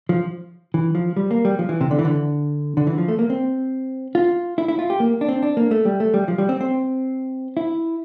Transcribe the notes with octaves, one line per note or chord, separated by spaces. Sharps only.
F3
E3
F3
G3
A#3
G3
F3
E3
C3
D3
E3
D3
D3
E3
F3
A3
A#3
C4
F4
E4
E4
F4
G4
A#3
D4
C4
D4
A#3
A3
G3
A3
G3
F3
G3
C4
C4
E4